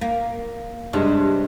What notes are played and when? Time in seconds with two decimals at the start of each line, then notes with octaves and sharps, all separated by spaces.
0.01 A#3
0.93 G2 C3 G#3